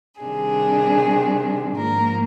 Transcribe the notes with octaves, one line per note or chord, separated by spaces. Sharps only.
C3 D#3 G3 D4 G#4
G#2 F3 A#3 A#4